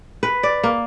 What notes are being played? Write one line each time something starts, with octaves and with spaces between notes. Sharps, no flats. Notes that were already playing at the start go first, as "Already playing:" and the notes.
B4
D5
A#3